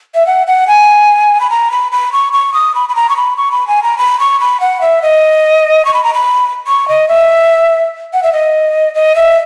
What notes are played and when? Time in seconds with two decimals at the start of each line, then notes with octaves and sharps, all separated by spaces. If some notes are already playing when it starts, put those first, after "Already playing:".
0.15 E5
0.26 F#5
0.47 F#5
0.67 G#5
1.40 B5
1.50 A#5
1.71 B5
1.92 B5
2.12 C#6
2.33 C#6
2.54 D#6
2.75 B5
2.89 B5
2.95 A#5
3.09 C#6
3.16 B5
3.37 C#6
3.52 B5
3.68 G#5
3.83 A#5
3.98 B5
4.20 C#6
4.40 B5
4.60 F#5
4.81 E5
5.02 D#5
5.85 C#6
5.94 B5
6.04 A#5
6.14 B5
6.67 C#6
6.88 D#5
7.08 E5
8.13 F#5
8.23 E5
8.33 D#5
8.94 D#5
9.15 E5